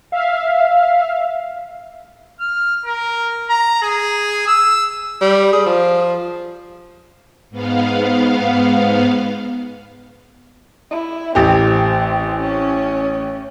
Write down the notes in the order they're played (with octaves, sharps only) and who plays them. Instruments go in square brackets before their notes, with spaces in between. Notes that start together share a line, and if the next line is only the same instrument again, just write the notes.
[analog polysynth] E5 F5
[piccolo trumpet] F6
A#4
A#5
G#4
E6
[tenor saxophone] G3
G#4
F3
[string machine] G#2 B3 F5
[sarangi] E4
[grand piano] A1 G4 [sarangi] C4
[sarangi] C#4